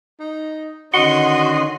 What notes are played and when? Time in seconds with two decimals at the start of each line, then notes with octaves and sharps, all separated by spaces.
0.20 D#4
0.94 D3 D#3 C#4 F#4 D#5 F#5 C6